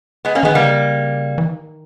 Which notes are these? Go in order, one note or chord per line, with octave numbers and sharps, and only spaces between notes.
G#3 B3
A#3 C#4
D#3 G#3 B3
C#3 G3 A#3
E3
D#3